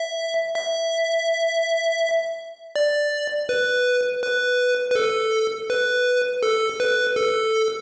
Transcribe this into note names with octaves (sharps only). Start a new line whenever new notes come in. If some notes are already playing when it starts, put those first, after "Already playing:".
Already playing: E5
E5
D5
B4
B4
B4
A4
B4
A4
B4
A4